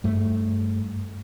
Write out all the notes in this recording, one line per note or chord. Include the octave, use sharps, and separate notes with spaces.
G2 A3